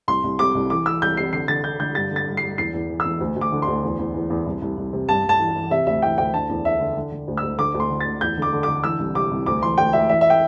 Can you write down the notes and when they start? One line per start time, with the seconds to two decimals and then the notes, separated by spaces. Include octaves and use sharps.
0.08 C2 C6
0.24 C2
0.39 C3 D6
0.55 C2
0.70 E3 D6
0.86 E3 E6
1.02 C2 G6
1.17 C3 C7
1.33 D3 C7
1.48 D3 A6
1.64 D3 G6
1.80 D3 G6
1.95 G2 A6
2.11 D3
2.16 A6
2.27 G2
2.37 G2 C7
2.58 E2 C7
2.74 E2
2.90 E3
3.00 E6
3.05 E2
3.21 D2
3.36 D2
3.41 D6
3.52 D3
3.62 C6
3.67 D2
3.84 E2
3.99 E2
4.14 E2
4.30 E2
4.46 C2
4.62 C2
4.77 C2
4.93 C3
5.08 G2 A5
5.24 G2
5.29 A5
5.39 E3
5.55 E3
5.71 C3 E5
5.87 D2 E5
6.02 E3 G5
6.18 D2 G5
6.33 D3 A5
6.49 E2
6.65 E2 E5
6.80 D3
6.96 D3
7.12 D3
7.28 D2
7.37 E6
7.43 D2
7.58 D3 D6
7.74 D2
7.80 C6
7.90 D3
8.01 A6
8.06 D2
8.21 E2 G6
8.37 D3 D6
8.53 D3
8.63 D3 D6
8.84 E3 E6
8.99 C2
9.15 C3 D6
9.31 C2
9.46 D2 D6
9.62 E3 C6
9.78 D2 G5
9.93 D2 E5
10.09 E3 E5
10.21 E5
10.30 G5